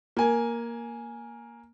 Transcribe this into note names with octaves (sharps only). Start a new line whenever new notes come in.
A#3 G#5